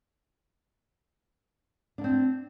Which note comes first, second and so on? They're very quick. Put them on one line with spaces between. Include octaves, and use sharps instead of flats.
D4 A#3 C4